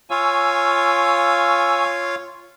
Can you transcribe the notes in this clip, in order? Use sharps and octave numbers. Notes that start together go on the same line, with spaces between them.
F4 C#5 F5 G#5 C#6 E6